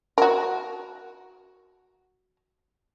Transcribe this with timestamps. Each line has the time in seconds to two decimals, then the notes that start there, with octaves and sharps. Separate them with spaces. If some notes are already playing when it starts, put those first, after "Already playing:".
0.18 F#4 A#4